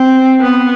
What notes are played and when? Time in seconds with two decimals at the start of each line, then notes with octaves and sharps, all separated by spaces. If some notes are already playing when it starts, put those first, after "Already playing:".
Already playing: C4
0.40 B3